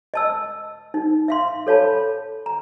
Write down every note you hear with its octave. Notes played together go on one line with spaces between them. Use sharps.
D#5 A5 E6
D#4
E5 F5 C6
A4 C#5 F5 A5 B5
A#5